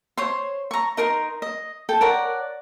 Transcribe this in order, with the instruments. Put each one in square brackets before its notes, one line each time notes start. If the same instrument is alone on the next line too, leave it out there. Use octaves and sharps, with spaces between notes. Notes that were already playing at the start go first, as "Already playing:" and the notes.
[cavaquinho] C5 C#5 C6
A#5 C#6
D#4 A#4 A#5 C6
D#5
A4 G5
A#4 C#5 D5 F#5